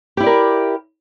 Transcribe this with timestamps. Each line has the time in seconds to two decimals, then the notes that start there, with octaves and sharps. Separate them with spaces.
0.17 G4
0.20 E4
0.23 D5
0.26 A#4